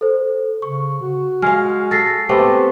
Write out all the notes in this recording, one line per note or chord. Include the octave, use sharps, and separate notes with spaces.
A4 C5
C#3 C#6
F#4
G#3 F5 F6
A4 A6 A#6 C7
A3 B3 C4 G4